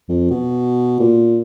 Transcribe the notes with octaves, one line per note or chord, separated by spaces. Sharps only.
F2
B2
A#2